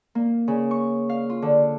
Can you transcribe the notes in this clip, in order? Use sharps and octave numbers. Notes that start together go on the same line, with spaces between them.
A#3
C#3
C#6
F5
F4
D3